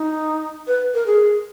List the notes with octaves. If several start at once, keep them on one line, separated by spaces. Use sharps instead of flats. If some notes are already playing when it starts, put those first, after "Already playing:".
Already playing: D#4
B4
A#4
G#4